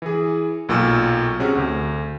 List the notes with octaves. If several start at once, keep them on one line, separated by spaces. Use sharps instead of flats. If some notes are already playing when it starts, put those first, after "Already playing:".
E3 G#4
B1 A#2 C#6 E6 F6
C3 C#4 F#4 G#4
D2